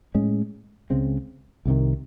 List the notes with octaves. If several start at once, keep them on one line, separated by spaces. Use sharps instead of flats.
A2 G#3 C#4
C#2 C#3 G#3 C4
C2 C3 D#3